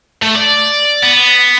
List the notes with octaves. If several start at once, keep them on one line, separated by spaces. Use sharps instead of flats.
A3
D5
B3